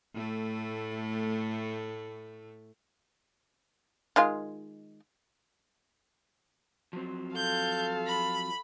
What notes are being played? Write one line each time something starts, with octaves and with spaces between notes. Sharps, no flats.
A2 A3
D#3 G#3 F4
F3 F#3 C4
A4 F5 G6
B5